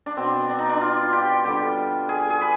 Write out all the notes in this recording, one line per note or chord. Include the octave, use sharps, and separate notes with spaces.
D4
B2 B3 C4
D4
D#4
D4
F4
G4
D3 G3 B3 G4
G#4
G#4
B4